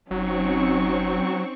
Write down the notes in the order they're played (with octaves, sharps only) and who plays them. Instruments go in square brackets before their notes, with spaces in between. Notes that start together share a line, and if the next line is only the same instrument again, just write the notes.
[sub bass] F#1 [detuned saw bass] F#3 [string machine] C4 C#6 [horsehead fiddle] C#4 D#4